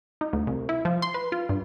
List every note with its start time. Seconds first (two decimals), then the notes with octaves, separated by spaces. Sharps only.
0.21 D#4
0.33 D2
0.47 C2
0.69 E4
0.85 F3
1.02 C6
1.14 B4
1.32 F4
1.49 G2